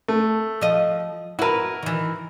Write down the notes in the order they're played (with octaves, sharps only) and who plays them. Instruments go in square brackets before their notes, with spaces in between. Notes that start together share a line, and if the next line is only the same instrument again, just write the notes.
[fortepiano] A3
[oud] F3 D#5
[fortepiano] E4 A#4 [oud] F#4 B4
[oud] D#3 E3